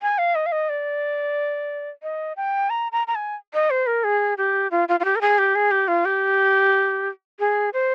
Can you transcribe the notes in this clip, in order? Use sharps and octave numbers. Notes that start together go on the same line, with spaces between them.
G#5
F5
D#5
F5
D#5
D5
D#5
G5
A#5
A#5
A#5
G#5
D#5
C5
A#4
G#4
G4
F4
F4
F4
G4
A#4
G#4
G4
G#4
G4
F4
G4
G#4
C5